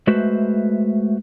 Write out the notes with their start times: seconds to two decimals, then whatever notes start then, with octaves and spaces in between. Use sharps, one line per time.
0.07 G#3 A3 F#4 B4 C5 E5